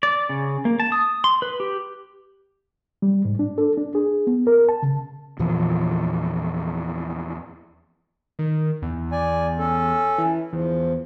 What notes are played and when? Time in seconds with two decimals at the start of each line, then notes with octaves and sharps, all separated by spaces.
0.03 D5
0.29 C#3
0.65 A#3
0.80 A5
0.92 D#6
1.24 C6
1.42 B4
1.60 G4
3.02 G3
3.25 G#2
3.39 D4
3.58 A4
3.77 D4
3.95 G#4
4.27 B3
4.47 A#4
4.69 A5
4.83 C#3
5.39 E2 A#2 E3 F3
8.39 D#3
8.82 E2
9.12 D5 G#5
9.59 C#4 A4
10.18 E3
10.53 E2 F3